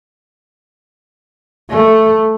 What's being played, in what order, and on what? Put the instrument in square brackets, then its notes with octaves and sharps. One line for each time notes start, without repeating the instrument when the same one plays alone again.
[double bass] A3